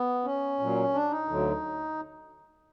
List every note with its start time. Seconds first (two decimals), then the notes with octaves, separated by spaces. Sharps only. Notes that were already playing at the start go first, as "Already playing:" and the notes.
Already playing: B3
0.25 C#4
0.59 A#2 F#3
0.94 D4
1.10 D#4
1.28 D2 D3 F#3